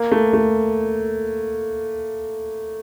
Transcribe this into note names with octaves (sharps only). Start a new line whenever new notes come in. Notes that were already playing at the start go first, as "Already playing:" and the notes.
Already playing: A#3
A3
A3